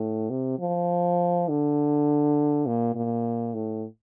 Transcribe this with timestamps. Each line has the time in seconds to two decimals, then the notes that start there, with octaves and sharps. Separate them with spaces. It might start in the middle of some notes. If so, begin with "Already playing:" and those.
Already playing: A2
0.30 C3
0.60 F3
1.49 D3
2.66 A#2
2.95 A#2
3.54 A2